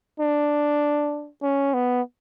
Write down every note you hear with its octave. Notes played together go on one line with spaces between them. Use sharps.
D4
C#4
B3